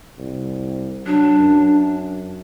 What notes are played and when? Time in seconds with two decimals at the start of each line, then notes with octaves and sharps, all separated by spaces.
0.19 C2
1.06 F#3 D4
1.39 F#2